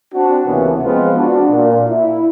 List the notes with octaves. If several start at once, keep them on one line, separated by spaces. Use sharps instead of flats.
C4 D4 F#4
C#2 C3 E3 A#3 B3 C#4
F3 G#3 B3 C4 F4
D4 F#4
A#2
E4